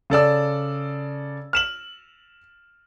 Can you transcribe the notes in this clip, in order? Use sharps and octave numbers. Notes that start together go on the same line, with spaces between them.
C#3 A4 D5 E6
F6 E7 F#7